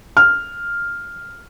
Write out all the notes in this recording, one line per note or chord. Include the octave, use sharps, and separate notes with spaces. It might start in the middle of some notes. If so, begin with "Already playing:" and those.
F6